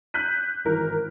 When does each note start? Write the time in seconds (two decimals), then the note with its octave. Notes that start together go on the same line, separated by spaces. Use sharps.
0.14 F#6 G6 B6 D#7
0.65 G#1 E3 A#4